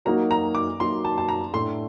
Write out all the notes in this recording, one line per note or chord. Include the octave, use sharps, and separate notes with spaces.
F#3 A#3 D#4 F#4 A#5
A#5
D6
F#3 A#3 D#4 F#4 C6
A5
A5
A#5
A2 A3 D4 C6